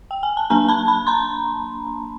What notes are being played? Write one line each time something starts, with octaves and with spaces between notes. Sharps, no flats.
G5
G#5
A5
F#3 A#3 D4 G#5 A#5
A5 B5
A5 B5
A#5 C6